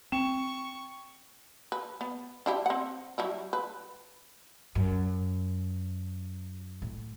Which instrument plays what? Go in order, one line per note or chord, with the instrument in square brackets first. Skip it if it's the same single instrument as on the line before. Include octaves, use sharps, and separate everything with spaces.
[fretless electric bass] C4 [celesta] G5 [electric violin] C#6 [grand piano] E7
[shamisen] B4
B3
D4 E4 G4
C4 F#5
F#3 G3 E4
B4
[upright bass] F#2
A2